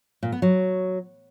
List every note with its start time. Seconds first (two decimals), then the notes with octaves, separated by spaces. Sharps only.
0.23 A#2
0.32 B3
0.42 F#3